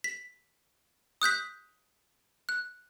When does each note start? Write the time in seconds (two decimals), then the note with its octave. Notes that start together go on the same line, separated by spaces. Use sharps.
0.04 B6
1.22 D#6 F#6 G6 B6
2.49 F#6